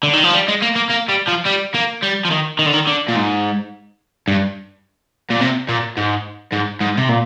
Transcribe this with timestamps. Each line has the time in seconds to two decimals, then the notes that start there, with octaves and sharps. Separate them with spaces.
0.03 D3
0.13 D#3
0.24 F3
0.34 G3
0.48 G#3
0.62 A#3
0.76 A#3
0.90 A#3
1.09 G3
1.28 F3
1.46 G3
1.75 A#3
2.03 G3
2.25 F3
2.31 D#3
2.59 D#3
2.66 D3
2.74 D#3
2.87 D3
3.08 A#2
3.16 G#2
4.28 G2
5.31 A#2
5.41 C3
5.69 A#2
5.97 G#2
6.53 G#2
6.81 G#2
6.97 C3
7.09 A#2